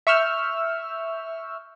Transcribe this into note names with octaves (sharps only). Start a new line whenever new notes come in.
E5 C#6 E6 F6 G6